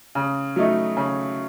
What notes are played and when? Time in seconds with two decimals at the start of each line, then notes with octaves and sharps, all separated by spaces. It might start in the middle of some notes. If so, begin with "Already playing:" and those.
0.15 C#3
0.56 F#3 A3 D#4
0.97 C#3